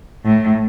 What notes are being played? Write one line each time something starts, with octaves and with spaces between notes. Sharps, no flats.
A2